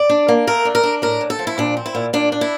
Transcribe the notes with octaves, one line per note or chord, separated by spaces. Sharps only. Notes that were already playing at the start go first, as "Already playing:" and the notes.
Already playing: D5
D4
A#3
A3 A#4
D4
A#4
D4
A2 A#4
A2
A4
F3
E4
A#2 D4
C4
E4
A#2
A#2 D4
D4
E4